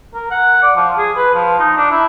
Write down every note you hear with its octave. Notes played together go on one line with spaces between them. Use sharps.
A#4
F#5
D5
F3
G#4
B4
F3
D#4
D4
E4